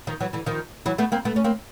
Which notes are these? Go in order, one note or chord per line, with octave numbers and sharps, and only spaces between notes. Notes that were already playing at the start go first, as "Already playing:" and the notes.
D#3 F3
E3 F#3
D3 E3
D#3 F3
E3 F#3
A3 B3
A#3 C4
A3 B3
C#4
A#3 C4